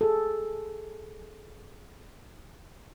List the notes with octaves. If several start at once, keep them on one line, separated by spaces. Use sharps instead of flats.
G#4 A4